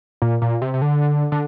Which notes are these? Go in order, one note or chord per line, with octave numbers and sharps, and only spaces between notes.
A#2
A#2
C3
C3
D3
D3